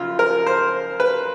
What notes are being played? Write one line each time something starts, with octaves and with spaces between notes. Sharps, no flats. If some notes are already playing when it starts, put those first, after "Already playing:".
Already playing: F#2 C#3 F3 F4
A#4
C5
B4